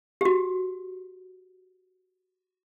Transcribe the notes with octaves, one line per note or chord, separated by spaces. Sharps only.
F#4 G4